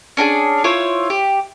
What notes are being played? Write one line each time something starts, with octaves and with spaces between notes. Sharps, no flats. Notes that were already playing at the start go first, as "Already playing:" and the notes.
C#4 D4 F#4 G#4
E4 F4 C5 C#5
G4